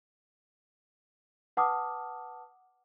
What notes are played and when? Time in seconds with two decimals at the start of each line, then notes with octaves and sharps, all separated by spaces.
1.57 B4 F#5 A5 D6 D#6 F6